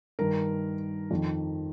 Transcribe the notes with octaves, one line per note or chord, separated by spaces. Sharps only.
G2 D#3 A#4
F2 D#3